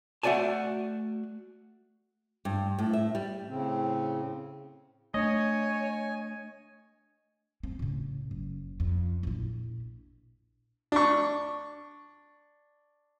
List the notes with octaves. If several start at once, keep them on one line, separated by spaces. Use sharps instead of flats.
A3 F#4 D5 G#5 A5
G2
A2
E5
G3
A2 C#3 C4
A3 D4 C#5 D#5 G#5
C4
A2 C#3
F#1
F2
A#1 E4
D4 C#6